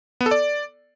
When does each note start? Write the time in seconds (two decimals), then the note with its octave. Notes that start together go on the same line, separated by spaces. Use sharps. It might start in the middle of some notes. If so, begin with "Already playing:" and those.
0.21 B3
0.26 A4
0.31 D5